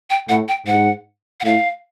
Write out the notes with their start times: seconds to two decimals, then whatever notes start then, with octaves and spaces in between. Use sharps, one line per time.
0.10 G5
0.29 A2 F#5
0.48 G5
0.67 G#2 F#5
1.40 F#5
1.44 A2 F5